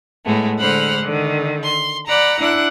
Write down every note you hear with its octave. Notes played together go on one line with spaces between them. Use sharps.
A2 G#3 A3 B3
D3 G#3 C5 F#5 B5 F6
D3 D#3
C6
D5 F#5 A#5 B5
D4 E4 F#5 F#6